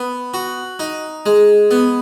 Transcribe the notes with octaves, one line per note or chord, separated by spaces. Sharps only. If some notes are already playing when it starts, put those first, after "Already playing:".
Already playing: B3
F#4
D#4
G#3
B3